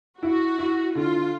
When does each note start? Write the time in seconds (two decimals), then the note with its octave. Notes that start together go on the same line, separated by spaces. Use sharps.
0.21 E4 F#4
0.58 E4
0.95 D3 F4